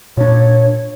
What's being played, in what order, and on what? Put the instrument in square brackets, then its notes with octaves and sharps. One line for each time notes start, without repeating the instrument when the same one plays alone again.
[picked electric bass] A#2 D4 [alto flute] C#5